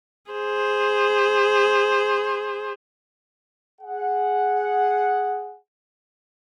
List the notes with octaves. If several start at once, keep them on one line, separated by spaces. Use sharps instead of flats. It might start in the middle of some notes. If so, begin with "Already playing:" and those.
G#4 C5
G#4 F#5